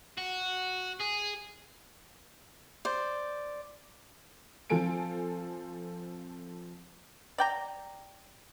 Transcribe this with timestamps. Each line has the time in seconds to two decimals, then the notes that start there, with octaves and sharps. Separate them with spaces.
0.18 F#4
1.00 G#4
2.85 C5 D5
4.70 F3 C4 F4 A4 G#5 D7
7.38 D5 G5 A#5